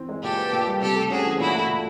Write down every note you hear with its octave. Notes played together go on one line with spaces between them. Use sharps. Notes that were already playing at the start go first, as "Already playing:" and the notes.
Already playing: E3 C4
G#3
A#2 G4 A4
B3
A#2
G3
C3 G4 A4
A3
C#4 F#4 G#4
E3
A#2 E4 F#4
A3
A#2